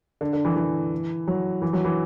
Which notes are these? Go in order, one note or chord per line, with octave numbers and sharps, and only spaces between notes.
D3
D3
E3
E3
F#3
E3
F#3
E3